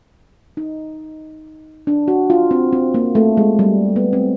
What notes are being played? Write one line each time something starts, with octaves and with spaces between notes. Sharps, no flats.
D#4
D4
F#4
F4
C4
C4
A#3
A3
G#3
G3
B3
C4